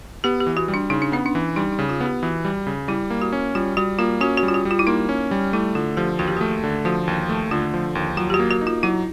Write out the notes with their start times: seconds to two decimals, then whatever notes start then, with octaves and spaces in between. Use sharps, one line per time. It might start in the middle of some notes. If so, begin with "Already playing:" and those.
0.24 B3 G4
0.40 G4
0.47 E3
0.57 F#4
0.68 G3
0.74 D4
0.90 C#3 D#4
1.02 D4
1.12 B3 C#4
1.26 D4
1.35 E3
1.56 G3 D#4
1.72 D#4
1.79 C#3
1.89 F4
2.00 B3
2.06 G4
2.23 E3 F#4
2.45 G3
2.67 C#3
2.88 G3 E4
3.10 A#3
3.22 F#4
3.33 C#4
3.55 G3 F4
3.77 G3 F#4
3.99 A#3 F4
4.21 C#4 F#4
4.37 F#4
4.43 G3
4.48 F4
4.54 F#4
4.65 G3
4.71 F4
4.79 E4
4.87 A#3 D#4
5.09 C#4
5.31 G3
5.53 A3 E4
5.75 D3 F4
5.97 F3 G4
6.19 D#2 F#4
6.28 G4
6.37 A3 F#4
6.63 D3
6.85 F3 F#4
7.08 D#2
7.29 A3
7.51 D3 F4
7.74 F3
7.95 D#2
8.17 F#3 F4
8.30 G4
8.34 F#4
8.39 A#3
8.51 F#4
8.61 D#4
8.67 F4
8.83 F#3 E4